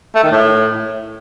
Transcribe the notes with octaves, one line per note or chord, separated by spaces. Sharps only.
A3
D#3
A2